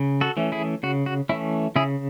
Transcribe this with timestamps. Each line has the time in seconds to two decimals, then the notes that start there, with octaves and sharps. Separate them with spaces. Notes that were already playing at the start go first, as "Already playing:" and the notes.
Already playing: C#3
0.21 F#4 A4
0.37 E3 A3 C#4
0.52 E4 G#4
0.83 C#3 F#4
1.06 F#4
1.29 E3 A3 C#4 E4
1.76 C#3 E4 G#4